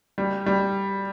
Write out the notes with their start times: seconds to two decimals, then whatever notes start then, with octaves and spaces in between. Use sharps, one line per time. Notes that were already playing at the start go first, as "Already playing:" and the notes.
0.18 G3
0.46 G3